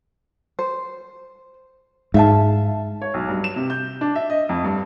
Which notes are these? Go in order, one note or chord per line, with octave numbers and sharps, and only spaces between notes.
C5
G#2 E5 F5 A5
C#5
B1
G2
E7
C3
G6
D4
E5
D#5
F2
G2